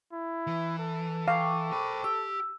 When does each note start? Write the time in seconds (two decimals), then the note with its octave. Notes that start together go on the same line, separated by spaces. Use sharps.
0.13 E4
0.47 E3
0.79 A4
1.28 F5 G5 C#6 D6
1.72 C5 B5
2.04 G4 E6